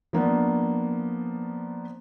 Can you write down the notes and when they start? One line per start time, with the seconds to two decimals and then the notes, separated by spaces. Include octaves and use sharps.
0.13 F3 A#3 B3 D4